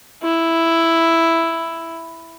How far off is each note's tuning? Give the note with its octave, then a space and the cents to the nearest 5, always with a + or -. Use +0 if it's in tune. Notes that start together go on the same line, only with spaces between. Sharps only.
E4 +5